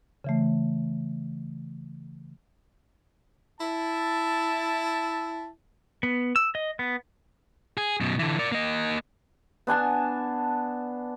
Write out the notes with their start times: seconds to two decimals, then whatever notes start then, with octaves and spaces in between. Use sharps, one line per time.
0.24 C#3 E3 A3
3.61 E4 A5
6.03 B3
6.36 E6
6.55 D#5
6.79 B3
7.77 G#4
8.01 F#2 B2
8.19 D3 E3
8.39 A#4 D5
8.52 A#3 D#5
9.67 B3 D4 G#5 A5